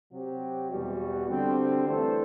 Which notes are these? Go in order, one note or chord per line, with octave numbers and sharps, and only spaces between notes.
C3 F#3 C4 G4
E2 B2 G3 B3 F#4
D3 G3 C4
E3 A3 D4 A4 C5